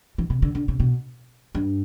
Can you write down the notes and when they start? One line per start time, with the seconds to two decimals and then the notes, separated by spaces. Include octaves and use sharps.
0.18 E3
0.30 C3
0.42 D3
0.55 D3
0.68 C3
0.80 B2
1.55 G2